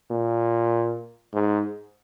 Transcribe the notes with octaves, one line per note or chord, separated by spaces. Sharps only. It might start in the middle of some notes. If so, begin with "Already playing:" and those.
A#2
G#2